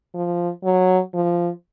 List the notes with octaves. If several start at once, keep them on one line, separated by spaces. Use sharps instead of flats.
F3
F#3
F3